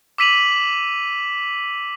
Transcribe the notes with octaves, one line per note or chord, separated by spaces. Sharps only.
D6 E6 B6 D#7 F7 F#7